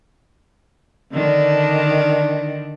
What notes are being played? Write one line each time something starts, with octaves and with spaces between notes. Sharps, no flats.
D3 D#3 D4